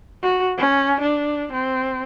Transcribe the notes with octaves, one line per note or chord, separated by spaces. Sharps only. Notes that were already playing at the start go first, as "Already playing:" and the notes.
F#4
C#4
D4
C4